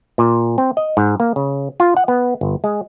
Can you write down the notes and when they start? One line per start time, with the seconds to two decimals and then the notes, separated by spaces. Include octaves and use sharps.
0.18 A#2
0.58 C4
0.77 D#5
0.97 G#2
1.20 A#3
1.36 C#3
1.80 F4
1.97 F#5
2.08 B3
2.41 G1
2.64 G#3